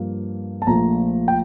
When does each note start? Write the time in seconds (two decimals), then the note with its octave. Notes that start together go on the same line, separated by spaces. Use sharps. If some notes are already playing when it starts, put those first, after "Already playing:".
Already playing: G2 F3 A#3
0.62 A5
0.67 A#1 A#2 F3 A3 A#5
1.28 G5